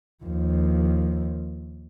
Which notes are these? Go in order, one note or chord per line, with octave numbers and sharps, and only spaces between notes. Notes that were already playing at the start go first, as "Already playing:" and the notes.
D#2 F3